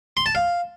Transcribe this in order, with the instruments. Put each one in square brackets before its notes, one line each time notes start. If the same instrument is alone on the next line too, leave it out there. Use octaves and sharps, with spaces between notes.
[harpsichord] C6
A5
F5